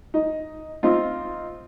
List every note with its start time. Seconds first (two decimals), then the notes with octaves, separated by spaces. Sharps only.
0.14 D#4
0.83 C4 D#4 F4